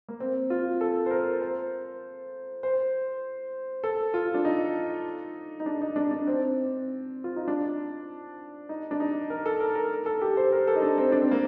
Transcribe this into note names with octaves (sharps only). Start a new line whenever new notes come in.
A#3
C4
F4
A4
C5
A#4
C5
C5
A4
F4
D4
D#4
D#4
D4
D#4
D4
D4
C4
F4
D#4
D4
D#4
D4
D#4
A#4
A4
A#4
A#4
A4
G4
C5
A#4
A4
D#4
D4
C4
D4
C4
A#3